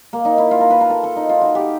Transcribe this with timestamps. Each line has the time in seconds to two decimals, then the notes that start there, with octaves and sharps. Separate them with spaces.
0.13 A#3
0.25 D#4
0.38 E4
0.51 F4
0.61 A#4
0.71 B4
0.81 A#4
0.90 A4
1.04 A4
1.16 D#4
1.29 F4
1.41 F#4
1.55 G4